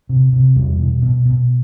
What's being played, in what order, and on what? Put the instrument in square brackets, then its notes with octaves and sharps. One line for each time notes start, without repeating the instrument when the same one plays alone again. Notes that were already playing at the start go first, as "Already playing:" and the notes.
[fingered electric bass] C3
C3
E2 G3
B2
B2
B2